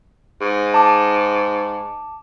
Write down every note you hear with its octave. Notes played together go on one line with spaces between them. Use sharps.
G#2
A5 D6